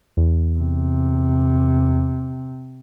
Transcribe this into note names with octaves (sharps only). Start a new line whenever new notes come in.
E2
C3